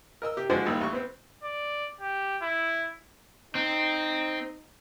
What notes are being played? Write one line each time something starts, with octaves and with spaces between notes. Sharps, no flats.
A#4 D#5 E6
C3 G4
D3 F3 G#3 F#4 C5 C6
A#1 D#2 D#3 G3
A1 C#6
B3 C4
D5
G4
E4
C4 D#4